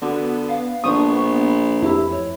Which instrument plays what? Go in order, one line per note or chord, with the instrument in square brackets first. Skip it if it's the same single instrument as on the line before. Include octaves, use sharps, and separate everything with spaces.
[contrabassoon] D3 [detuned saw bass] B3 [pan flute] F#4
[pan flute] F5
[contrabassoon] A#1 [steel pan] D4 C5 D#6 [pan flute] C#6
[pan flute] B5
[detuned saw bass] F2 [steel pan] E4 [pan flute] G4
[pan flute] C#5